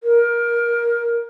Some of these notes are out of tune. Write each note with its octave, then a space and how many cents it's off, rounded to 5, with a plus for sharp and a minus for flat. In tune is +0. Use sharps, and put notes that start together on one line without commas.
A#4 +20